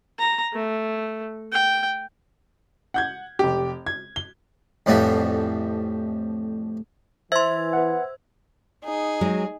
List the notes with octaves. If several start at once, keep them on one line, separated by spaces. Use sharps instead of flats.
A#5
A3
G5
F#5 G6 G#6
F1 G4
G#6
G7
F2 A2 E3 G3 B3
E3 C5 E5 C6 E6 G#6
B4 F#5
D#4 G#4
F#3 G#3